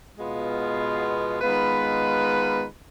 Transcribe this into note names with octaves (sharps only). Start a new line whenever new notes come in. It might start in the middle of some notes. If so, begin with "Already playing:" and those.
B2 G#3 B3 F4
D#3 G#3 B3 F4 B4